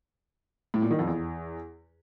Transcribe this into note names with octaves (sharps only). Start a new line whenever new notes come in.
A2
A#2
D#3
F2
E2